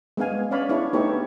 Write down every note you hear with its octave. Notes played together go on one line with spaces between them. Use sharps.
G#3 B3 D4 F5 G#5
B3 C#4 C#5 D5 F5 B5
D4 E4 G#4 C#5
A3 B3 D#4 G4 A4 C#5